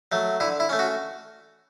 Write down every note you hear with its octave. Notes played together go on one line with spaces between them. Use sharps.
F#3 A3
D3 E4
E4
A3 C#4
F#4